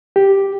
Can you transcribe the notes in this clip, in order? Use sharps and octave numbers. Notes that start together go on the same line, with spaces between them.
G4